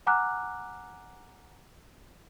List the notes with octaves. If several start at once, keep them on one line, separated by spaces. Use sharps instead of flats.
F#5 G#5 A#5 D6 F6 F#6